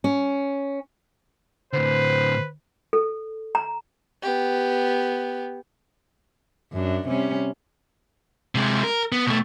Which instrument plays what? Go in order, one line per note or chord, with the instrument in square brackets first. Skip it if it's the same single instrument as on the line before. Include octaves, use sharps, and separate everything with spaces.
[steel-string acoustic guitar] C#4
[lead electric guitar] A2 D3 [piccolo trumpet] B4 [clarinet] C5
[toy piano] A4
A#5
[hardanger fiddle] B3 G4
[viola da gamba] F#2 D4
C3 G3 C#4
[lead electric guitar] C3 G#3
A#4
B3
B2 A3